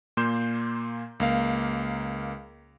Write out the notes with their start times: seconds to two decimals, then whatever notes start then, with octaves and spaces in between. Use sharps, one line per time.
0.17 A#2 A#3 C6 G6 E7
1.20 C#2 A#3 F5